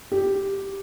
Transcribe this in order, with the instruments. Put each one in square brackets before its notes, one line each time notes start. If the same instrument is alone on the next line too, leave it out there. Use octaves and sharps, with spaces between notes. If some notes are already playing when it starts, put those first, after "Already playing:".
[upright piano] G4